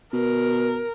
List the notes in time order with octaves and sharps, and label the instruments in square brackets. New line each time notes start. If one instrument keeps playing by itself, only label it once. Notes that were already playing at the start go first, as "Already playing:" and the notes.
[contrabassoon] B2 [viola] A#4